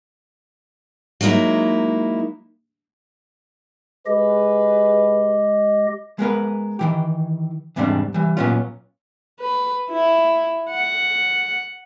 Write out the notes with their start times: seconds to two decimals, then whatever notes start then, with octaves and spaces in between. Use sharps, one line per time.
1.21 F#3 G#3 A#3 D#4 E4
4.06 G#3 G4 G#4 B4 D#5
6.19 G#3 B3 A#4 B4
6.79 D#3 E3 G4
7.76 E2 G#2 C3 G3 C4 D4
8.14 E3 G3
8.37 A#2 F#3 B3 C#4 F4
9.40 B4
9.91 E4
10.71 F#5